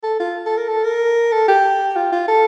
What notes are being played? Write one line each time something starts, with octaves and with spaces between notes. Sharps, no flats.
A4
F4
A4
A#4
A4
A#4
A4
G4
F4
F4
A4